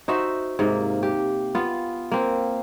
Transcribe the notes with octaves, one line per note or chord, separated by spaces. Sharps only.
D#4 F#4 C5 E5
G#2 C3 A#3
G4
B3 F4
A#3 C4